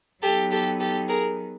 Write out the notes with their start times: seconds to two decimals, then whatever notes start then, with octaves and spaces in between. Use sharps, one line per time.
0.22 F#3 B3 D#4 G4 A4
0.51 G4 A4
0.80 G4 A4
1.08 G#4 A#4